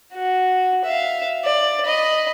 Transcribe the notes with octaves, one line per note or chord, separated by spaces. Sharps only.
F#4
E5 F5
D5
D#5 B5